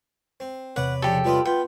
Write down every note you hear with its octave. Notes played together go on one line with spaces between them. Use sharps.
C4
E2 C3 B4 C#5 D5 F#5
C#3 F3 D4 G4 A4
G3 F4 B4 D#5
B3 F4 G5